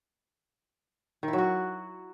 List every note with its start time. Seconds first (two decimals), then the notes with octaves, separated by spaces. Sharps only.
1.23 D#3
1.28 E4
1.33 F#3
1.38 F#4